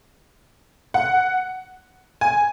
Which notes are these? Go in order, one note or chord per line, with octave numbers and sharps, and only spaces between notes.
F#5
G#5